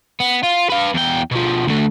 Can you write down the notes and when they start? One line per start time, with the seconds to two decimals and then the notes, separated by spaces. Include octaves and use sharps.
0.20 B3
0.43 F4
0.70 B4 F5
0.94 E2 G5
1.31 B2 F3
1.67 D2 A3